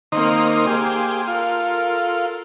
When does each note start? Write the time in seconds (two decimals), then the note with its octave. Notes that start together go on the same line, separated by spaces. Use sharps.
0.12 D#3 A#3 C4 D#4 A#4 C5
0.67 A#3 G4 G#4 C5
1.27 F4 A4 A#4